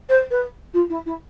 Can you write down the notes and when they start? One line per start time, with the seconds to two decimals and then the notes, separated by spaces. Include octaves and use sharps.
0.09 C5
0.31 B4
0.74 F4
0.89 E4
1.06 E4